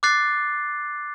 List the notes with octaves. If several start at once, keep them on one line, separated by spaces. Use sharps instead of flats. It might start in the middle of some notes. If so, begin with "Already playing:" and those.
D6 F#6 A6 C7